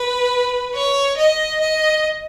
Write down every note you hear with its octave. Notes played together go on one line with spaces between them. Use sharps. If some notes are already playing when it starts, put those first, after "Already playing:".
Already playing: B4
C#5
D#5
D#5